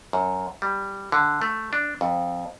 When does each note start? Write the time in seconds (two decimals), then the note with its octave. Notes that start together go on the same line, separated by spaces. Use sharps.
0.13 F#2
0.62 G3
1.12 D3
1.42 A3
1.73 D4
2.01 F2